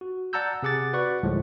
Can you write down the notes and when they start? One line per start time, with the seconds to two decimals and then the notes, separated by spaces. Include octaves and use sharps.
0.01 F#4
0.33 D5 F#5 A5 A#5 E6 G6
0.63 C3 G#4 F#5 D6 A6
0.93 F#4 B4 D5 F#5 C#6
1.23 D2 A2 F3 G3 G#3